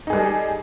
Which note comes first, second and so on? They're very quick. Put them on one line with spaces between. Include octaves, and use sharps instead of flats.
D#4 G#4 G3 A4